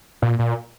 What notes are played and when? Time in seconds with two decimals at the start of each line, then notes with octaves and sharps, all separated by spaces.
0.22 A#2
0.39 A#2